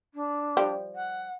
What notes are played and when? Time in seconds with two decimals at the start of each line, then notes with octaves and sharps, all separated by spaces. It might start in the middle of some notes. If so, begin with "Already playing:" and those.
0.14 D4
0.57 F3 G3 G5
0.95 F#5